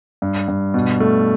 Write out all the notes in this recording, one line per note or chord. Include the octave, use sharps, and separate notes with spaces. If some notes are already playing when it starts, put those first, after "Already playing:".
G2
G2
B2
A3